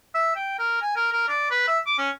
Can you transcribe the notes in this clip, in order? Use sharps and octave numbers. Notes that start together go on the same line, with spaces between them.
E5
G5
A#4
G#5
A#4
A#4
D5
B4
E5
D6
C#4